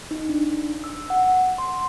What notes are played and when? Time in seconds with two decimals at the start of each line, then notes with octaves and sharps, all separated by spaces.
0.11 D#4
0.29 D4
0.84 E6
1.10 F#5
1.58 C6